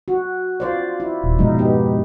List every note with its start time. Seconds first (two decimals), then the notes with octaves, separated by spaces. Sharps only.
0.08 F#4
0.60 F4 C5 D5
1.00 E4
1.24 D#1
1.39 F2 G#2 B2 D#4
1.59 B3 G4